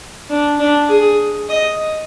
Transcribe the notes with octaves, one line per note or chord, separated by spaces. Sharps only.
D4
D4
G#4
D#5